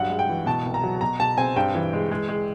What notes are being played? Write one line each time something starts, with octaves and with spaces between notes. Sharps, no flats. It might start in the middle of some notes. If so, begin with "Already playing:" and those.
Already playing: G2 F#3 F#5
G#3
G5
E3
B2 A5
C2
A#5
F#3
B2 A#5
B2 A5
C4 G#5
G2 G5
E3
G#3
G#3
G#3